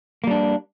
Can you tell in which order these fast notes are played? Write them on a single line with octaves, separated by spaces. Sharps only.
A#3 G3 D4